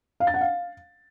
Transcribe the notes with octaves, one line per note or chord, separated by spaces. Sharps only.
F5
A6
F#5
F5